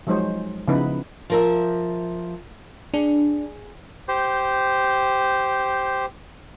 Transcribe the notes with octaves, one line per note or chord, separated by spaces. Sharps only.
F3 F#3 G#3 D#4 C5 C#5
C#3 F3 B3 D#4 E4 B4
F3 A#4 E5
D4 G#4
G4 C5